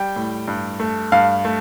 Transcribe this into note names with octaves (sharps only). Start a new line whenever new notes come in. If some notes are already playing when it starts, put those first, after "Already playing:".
Already playing: G3 G5
A2
G2
A3
G2 F5
A3